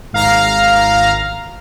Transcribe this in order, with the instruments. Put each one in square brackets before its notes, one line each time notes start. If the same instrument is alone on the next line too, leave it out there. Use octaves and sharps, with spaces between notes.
[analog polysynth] G#1 F5 A#5 F6